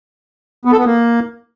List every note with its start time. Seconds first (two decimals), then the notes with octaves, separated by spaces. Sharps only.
0.65 B3
0.72 A4
0.79 B3
0.86 A#3